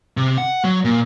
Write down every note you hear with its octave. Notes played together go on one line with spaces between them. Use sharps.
C3
F#5
F#3
A#2